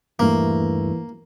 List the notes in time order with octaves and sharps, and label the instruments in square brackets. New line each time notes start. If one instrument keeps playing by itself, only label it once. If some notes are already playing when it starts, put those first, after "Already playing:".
[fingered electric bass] D#1 G2 A3 [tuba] E3 [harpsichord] A#3